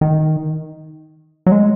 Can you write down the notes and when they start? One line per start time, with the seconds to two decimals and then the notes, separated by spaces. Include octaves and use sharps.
0.01 D#3
1.47 F#3
1.52 G#3